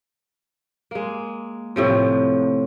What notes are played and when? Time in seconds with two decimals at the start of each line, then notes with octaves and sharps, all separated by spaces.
0.91 G#3 A#3
1.76 A2 C3 F3